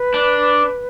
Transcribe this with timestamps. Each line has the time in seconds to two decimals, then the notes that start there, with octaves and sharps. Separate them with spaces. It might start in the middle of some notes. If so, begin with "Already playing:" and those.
Already playing: B4
0.14 D4